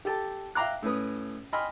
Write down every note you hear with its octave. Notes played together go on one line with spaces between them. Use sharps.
G4 A4 G5 A5
E5 F5 G5 A#5 D6 F#6
A2 C#4 B4 D#6
D#5 G5 G#5 B5 C6 F6